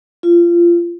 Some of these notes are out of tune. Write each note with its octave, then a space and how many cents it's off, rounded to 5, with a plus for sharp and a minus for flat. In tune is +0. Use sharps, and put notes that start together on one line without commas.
F4 -25